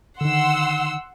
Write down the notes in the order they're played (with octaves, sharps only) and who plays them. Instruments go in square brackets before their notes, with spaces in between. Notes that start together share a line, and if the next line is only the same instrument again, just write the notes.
[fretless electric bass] D3 D#3 [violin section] F#5 C6 E6